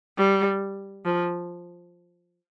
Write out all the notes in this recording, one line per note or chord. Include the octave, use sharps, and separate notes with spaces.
G3
F3